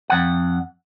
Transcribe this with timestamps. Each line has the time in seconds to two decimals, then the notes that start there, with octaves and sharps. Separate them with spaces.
0.10 F2 F#5